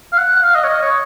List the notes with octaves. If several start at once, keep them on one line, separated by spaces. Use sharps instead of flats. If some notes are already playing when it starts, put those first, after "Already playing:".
F5
F#5
F#5
F5
D#5
C#5
D#5
C#5